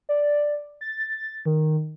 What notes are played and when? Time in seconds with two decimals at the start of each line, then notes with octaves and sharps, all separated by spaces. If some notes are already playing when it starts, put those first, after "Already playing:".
0.09 D5
0.81 A6
1.45 D#3